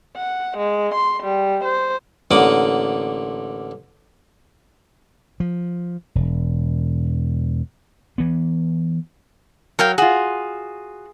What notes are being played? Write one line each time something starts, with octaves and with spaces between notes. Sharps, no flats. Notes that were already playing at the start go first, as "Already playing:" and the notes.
F#5
G#3
C6
G3
C5
A1 D3 A#3 F#5 D6 D#6
F3
E1
E3 B3
F#3 A#4 F5 G5
F4 F#4 G#4